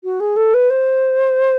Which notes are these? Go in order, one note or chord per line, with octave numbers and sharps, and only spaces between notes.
F#4
G#4
A4
B4
C5